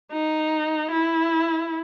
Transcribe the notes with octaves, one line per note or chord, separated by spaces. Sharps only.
D#4
E4